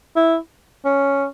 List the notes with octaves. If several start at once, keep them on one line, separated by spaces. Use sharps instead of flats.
E4
C#4